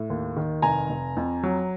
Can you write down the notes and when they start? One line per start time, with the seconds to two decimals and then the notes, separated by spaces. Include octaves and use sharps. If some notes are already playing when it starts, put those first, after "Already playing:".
Already playing: A2
0.10 D#2
0.37 D#3
0.62 F1 G#5 A#5
0.89 F1
1.17 F2
1.43 F#3